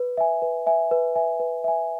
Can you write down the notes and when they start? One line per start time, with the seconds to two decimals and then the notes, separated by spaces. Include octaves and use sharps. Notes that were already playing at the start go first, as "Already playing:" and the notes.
Already playing: B4
0.17 E5 G#5
0.42 B4
0.67 E5 G#5
0.91 B4
1.16 E5 G#5
1.40 B4
1.64 E5 G#5